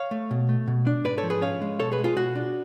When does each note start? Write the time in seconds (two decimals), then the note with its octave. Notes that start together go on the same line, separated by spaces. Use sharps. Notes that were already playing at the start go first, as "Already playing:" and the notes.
Already playing: C#5 F5
0.11 A3
0.31 B2
0.49 A3
0.68 B2
0.87 D4
1.04 G#2 B4 D5
1.18 A4 C#5
1.23 F3
1.30 G#4 B4
1.41 C#4 C#5 F5
1.61 G#3
1.79 B2 A4 C#5
1.92 G#4 B4
1.99 G#3
2.04 F4 G#4
2.16 B2 F#4
2.35 D4